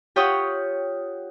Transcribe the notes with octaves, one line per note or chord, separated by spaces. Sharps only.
F4 G4 C#5 F#5 G5 D#6